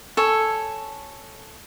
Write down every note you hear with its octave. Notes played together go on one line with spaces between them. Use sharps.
A4 C#5 G#5